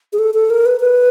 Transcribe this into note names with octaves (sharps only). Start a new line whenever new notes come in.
G#4
A4
A4
A#4
B4
B4